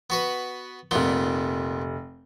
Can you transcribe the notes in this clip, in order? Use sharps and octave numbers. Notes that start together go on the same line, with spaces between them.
B3 F#4 B4
F1 A#2 B3 D4 G7